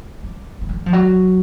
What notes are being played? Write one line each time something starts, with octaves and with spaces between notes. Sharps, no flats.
G3
G#3
G3
F3
F#3